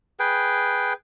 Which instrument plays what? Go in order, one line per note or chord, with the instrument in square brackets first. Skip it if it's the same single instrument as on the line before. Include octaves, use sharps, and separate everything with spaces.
[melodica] G#4 B4 G5